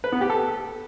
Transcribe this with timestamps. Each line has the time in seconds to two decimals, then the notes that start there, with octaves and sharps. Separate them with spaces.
0.04 B4
0.12 B3
0.21 G4
0.30 A4